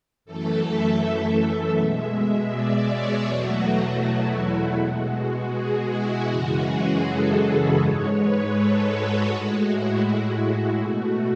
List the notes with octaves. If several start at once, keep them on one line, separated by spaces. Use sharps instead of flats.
F#2 E3 A3 A4
E5
B2 G#3
D5
C#5
E2 B2 F#3 A3 F#4
E4
B2 G#3 F#4
F#4
G#4
E4
F#2 C#3 E3 G#3 F#4
G#4
A4
B4
G#2 G#3 C#5
B4
A4
F#4
A2 G#3 F#4
E4
F#4
B2 A3